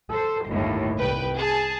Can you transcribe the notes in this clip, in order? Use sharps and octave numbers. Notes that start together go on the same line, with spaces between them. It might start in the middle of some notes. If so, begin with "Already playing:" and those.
A4 C5
G1 D#2 A2
C2 B4 G5
G#4 A5